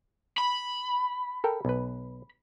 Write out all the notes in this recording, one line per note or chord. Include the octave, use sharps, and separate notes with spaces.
B5
A4 A#4 G5
B1 B4